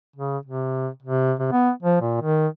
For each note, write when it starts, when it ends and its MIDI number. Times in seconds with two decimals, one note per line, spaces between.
0.16 0.38 49
0.45 0.88 48
1.02 1.34 48
1.39 1.49 48
1.52 1.71 59
1.82 2.00 53
2.01 2.18 46
2.21 2.47 51